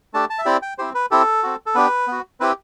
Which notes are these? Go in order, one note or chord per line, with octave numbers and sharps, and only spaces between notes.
A3 D4 G4 A5
A5
E5
C4 E4 G4 D5
G5
C4 E4 G4 C5
B4
C4 E4 G4 A4
C4 F#4
A4
B3 D4 G4 B4
B3 F#4
C4 E4 G4 B4